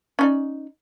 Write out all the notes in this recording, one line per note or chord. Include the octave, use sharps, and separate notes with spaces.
C#4 D#4 D5